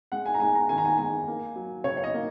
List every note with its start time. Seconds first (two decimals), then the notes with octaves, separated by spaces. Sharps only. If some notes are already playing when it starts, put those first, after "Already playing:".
0.12 G#3 F#5
0.26 G#5
0.34 A#5
0.40 G#3 G#5
0.55 A#5
0.69 D#3 G#5
0.78 A#5
0.85 G#5
0.98 G#3 G#5
1.27 A#3
1.56 F#3
1.84 C#3 C#5
1.97 C#5
2.04 D#5
2.14 A#3